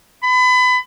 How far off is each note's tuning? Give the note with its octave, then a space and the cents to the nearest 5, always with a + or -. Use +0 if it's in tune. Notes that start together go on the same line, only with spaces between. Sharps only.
B5 +30